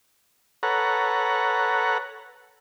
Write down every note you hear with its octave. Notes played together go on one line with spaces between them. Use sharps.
A4 B4 C#5 F#5 A#5